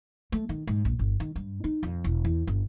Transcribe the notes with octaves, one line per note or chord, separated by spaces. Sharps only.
A3
D#3
G#2
A#1
G1
D#3
G2
D#4
F2
E1
E2
G1